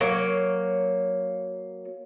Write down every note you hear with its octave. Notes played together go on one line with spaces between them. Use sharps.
F#3 A#3 C#5